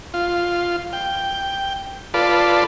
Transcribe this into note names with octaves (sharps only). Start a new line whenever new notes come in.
F4
G5
F4 A4 B4 D5